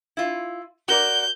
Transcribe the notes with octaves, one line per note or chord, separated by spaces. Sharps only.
E4 F4
F#4 A#4 D5 G6